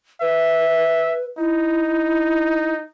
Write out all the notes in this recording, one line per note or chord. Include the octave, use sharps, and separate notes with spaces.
B4 E5
D#4 E4